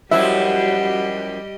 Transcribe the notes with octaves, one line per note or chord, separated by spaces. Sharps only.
F#2 F3 G3 E4 F#4 G4 D#5 E5